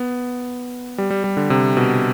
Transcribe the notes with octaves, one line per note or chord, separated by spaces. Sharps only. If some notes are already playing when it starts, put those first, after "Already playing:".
Already playing: B3
G3
G3
G3
D3
C3
B2